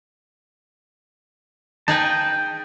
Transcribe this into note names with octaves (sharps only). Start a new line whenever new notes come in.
D#4 G#4 B4 G5 A5